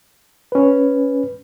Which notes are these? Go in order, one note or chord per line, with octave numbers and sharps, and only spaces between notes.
C#4 B4